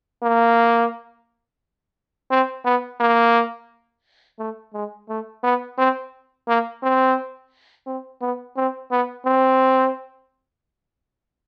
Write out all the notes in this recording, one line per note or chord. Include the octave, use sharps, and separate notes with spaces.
A#3
C4
B3
A#3
A3
G#3
A3
B3
C4
A#3
C4
C4
B3
C4
B3
C4